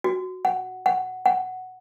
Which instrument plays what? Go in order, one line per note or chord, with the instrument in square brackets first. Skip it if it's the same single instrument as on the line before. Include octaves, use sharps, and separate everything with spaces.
[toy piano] F#4
F#5
F#5
F#5